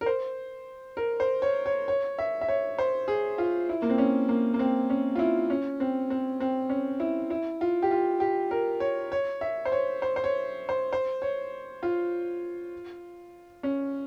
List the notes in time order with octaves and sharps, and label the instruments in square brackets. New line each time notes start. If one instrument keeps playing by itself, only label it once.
[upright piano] A#4
C5
A#4
C5
C#5
C#5
C#5
E5
E5
C#5
C5
G#4
F4
E4
A#3
C4
C#4
A#3
A#3
C4
C#4
F4
E4
C#4
C4
C4
C4
C#4
E4
E4
F4
G4
F4
G4
A#4
C#5
C#5
E5
C5
C#5
C5
C5
C#5
C5
C5
C#5
F4
C#4